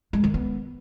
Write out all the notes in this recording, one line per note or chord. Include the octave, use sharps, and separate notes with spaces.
G#3
D#3
B3